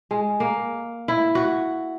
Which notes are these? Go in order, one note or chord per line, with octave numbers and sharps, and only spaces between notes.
G#3
A#3
E4
F#4